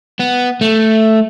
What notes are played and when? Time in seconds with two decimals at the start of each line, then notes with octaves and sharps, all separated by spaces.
0.19 B3
0.61 A3